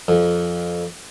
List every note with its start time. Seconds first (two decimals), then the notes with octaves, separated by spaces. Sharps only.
0.08 F2